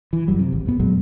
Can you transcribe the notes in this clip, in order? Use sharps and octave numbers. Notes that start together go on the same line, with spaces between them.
E3
F#1 F#2 F#3 G3
C3
G#1
A#1 F2 B3
F2 A#2 F#3 G#3